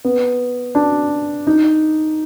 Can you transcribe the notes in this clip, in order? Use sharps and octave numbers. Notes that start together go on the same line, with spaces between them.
B3
D4
D#4